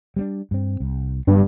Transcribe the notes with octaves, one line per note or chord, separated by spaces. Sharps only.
G3 B3 D4
G2 C4
C2
F#1 G2 B3 D4